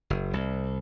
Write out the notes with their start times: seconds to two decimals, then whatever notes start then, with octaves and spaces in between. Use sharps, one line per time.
0.10 F#1
0.33 C2